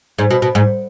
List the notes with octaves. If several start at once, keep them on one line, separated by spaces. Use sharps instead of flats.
G#2
B2
B2
G#2